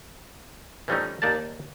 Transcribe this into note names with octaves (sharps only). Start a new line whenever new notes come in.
E3 F3 G3 A3 C#4 D#4
D#2 A#3 D#4 D5 F5 A5